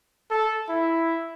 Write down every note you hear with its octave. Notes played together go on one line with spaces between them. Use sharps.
A4
E4